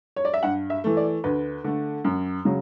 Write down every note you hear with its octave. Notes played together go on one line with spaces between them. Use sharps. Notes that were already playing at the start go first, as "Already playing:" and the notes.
C#5
D5
E5
G2 F#5
E5
E3 A3
D5
D2 B4
D3 A3
F#2
C#3 F#3